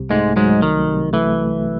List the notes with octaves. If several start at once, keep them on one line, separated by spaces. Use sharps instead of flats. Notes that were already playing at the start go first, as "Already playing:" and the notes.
Already playing: C2 C3
G#2 G#3 A3
G#2 F#3 G#3
C2 D#3
C3
E3 A3